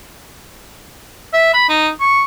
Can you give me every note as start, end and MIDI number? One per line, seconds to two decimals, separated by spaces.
1.33 1.50 76
1.54 1.67 83
1.69 1.88 63
2.00 2.24 85